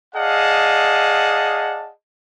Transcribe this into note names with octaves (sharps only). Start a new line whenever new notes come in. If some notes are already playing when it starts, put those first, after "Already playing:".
G#4 D5 D#5 F5 F#5 A5